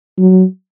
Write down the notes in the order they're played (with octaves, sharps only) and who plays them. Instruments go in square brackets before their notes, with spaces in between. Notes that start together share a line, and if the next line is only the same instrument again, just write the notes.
[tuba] F#3